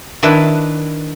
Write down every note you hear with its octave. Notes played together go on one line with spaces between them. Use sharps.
D#3 D4 E4 B4